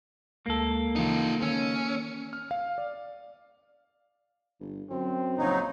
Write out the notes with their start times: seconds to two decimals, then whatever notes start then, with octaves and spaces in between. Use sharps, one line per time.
0.46 D2 G#3 A#3 A4
0.96 C#3 E3 F3 D#4 F4
1.42 D#3 C#4 G#5 E6
2.33 F6
2.51 F5
2.78 D5
4.60 G1
4.90 F#2 C4
5.38 A#1 C#3 F#3 D#4